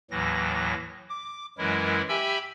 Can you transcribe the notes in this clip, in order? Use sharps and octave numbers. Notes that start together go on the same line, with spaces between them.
D#2 A2 E3 F#3 A#6
D6
F#2 E3 F#3 G#3 E4 A#4
G4 E5 G5 G#5 B5 E6